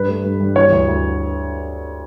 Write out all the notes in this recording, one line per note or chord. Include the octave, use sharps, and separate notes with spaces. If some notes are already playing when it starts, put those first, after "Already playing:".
Already playing: G2 B4
A3
G2
G2
E3 C#5
D2
D2